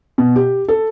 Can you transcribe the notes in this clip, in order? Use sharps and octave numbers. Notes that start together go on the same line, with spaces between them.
B2
G4
A4